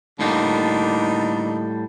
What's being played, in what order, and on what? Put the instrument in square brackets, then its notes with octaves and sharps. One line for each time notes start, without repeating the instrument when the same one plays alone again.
[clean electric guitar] A2 G3 F4 [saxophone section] D3 A#3 D#4